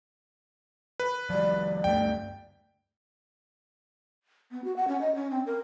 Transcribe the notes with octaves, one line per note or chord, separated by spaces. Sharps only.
B4
F3 G3 D5
D2 G2 A3 G5
B3
F#4
F#5
C#4
D#5
C#4
C4
A#4